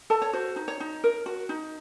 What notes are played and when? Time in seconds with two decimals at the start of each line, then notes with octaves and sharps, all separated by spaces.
0.10 A4 A5
0.22 C#5
0.33 F#4 C5
0.56 D#4
0.68 C#5
0.80 D#4
1.04 A#4
1.26 F#4
1.49 D#4